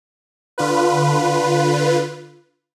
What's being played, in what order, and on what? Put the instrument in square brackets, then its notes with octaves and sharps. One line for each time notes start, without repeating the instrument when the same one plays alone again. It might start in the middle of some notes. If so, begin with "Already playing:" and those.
[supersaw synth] D3 F4 B4